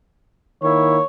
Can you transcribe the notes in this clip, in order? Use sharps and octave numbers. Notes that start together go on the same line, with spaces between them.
D#3 A#3 E4 C#5